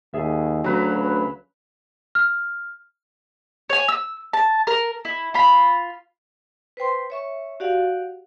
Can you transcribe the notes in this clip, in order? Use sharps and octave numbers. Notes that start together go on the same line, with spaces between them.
D#2 G#4 E5
D2 C#3 F#3 B4 A#5
F6
C#5 G#5
E6
A5
A#4
E4
F4 B5
B4 C5 G5 C6
C#5 E5 C#6
F#4 G4 D5 F5 F#5